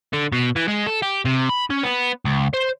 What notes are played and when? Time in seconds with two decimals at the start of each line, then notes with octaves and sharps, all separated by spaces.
0.13 D3
0.32 B2
0.56 E3
0.68 G#3
0.87 A4
1.02 G4
1.25 C3
1.49 B5
1.70 C#4
1.83 B3
2.25 C#2
2.54 C5